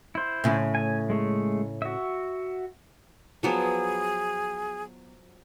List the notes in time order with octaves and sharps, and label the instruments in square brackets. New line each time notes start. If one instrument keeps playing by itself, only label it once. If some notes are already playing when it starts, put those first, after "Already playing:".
[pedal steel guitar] E4 C5
[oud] A2 C#3
[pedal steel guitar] G#5
G#3 A3
F#4 E5
[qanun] F3 F#3 B3 [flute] G#4